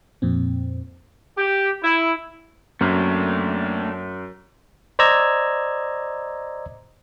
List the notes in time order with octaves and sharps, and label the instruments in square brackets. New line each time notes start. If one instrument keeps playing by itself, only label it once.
[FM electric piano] F2 A#2 C4
[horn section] G4
E4
[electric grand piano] F#2 [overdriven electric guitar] A3 D4 [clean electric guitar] A#3 C4 A#4
[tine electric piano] C5 D5 D#5 A#5 E6 G#6